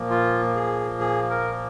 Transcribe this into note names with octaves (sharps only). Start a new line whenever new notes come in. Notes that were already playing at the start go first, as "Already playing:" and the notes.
Already playing: A#2 F3 A#3
F4
G#4
G#4
A#4